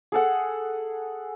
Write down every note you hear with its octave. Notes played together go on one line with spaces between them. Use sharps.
G#4 A4 F#5